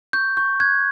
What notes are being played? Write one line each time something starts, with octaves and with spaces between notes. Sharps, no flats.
C#6 G6
C#6 G6
F#6 G#6